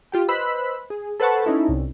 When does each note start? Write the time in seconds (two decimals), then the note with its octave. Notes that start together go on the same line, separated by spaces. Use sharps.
0.12 F4 G4 G5
0.28 B4 C5 D#5 B5 E6 F#6
0.90 G#4
1.20 A4 B4 C5 F#5 A5 C#6
1.45 C#4 D#4 E4 A4
1.68 C2